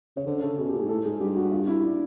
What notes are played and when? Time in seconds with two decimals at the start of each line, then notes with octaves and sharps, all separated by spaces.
0.16 C#3 C#5
0.26 D3 C5
0.42 C#3 A4
0.58 B2 G#4
0.69 G4
0.73 A#2
0.79 G#4
0.82 G#2
0.89 A2 A4
1.05 G#2 G#4
1.20 G2 G4
1.36 F#4
1.52 F4
1.67 E4
1.84 D4